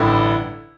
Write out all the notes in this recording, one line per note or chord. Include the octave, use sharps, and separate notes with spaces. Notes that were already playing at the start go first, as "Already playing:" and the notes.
Already playing: A1 G2 D3 E4